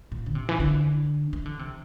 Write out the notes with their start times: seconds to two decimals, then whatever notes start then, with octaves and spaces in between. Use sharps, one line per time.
0.12 A#2
0.26 D3
0.35 C3
0.49 E3
0.60 D3
1.33 E3
1.45 D3
1.59 C3